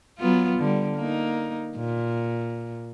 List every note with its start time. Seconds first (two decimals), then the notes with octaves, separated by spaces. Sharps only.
0.18 F#3 B3 F4
0.59 D3 G3
0.96 A#3 D#4
1.76 A#2